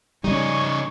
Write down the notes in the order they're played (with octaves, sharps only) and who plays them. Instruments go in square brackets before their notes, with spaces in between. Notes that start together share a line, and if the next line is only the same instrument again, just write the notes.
[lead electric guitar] C#3 D#4 [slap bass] G3 C4 C#4 [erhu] C#5